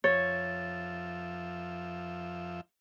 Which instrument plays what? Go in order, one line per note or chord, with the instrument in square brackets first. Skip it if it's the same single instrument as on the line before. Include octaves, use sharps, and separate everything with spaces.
[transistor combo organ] F2 F3 E5 [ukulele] C#5 [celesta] A6